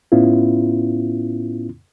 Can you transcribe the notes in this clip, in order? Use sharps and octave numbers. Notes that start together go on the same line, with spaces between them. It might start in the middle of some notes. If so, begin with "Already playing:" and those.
A2 B3 C#4 E4 F4